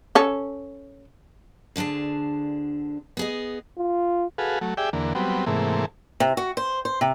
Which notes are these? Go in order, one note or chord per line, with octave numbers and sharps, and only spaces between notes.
C#4 A4
D2 D3 D4 G#4 A5
B3 G#4 D#5
F4
F#4 G#4 A4 B4 F5
F#3 A3
G4 G#4 D5 E5 G5
E2 D3 A#3
F#3 G3 B3 C4
G#2 C3 E3 A3 A#3
C3
F#4
C5
C5
C3